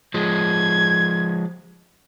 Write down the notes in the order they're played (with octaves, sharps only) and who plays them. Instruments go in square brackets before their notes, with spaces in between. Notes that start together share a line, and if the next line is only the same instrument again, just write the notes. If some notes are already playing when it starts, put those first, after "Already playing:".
[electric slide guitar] F3 G#3 [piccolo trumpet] G#6